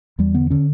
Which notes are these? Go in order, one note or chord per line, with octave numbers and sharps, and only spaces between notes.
E2 G3
D3 B3
D3 C#4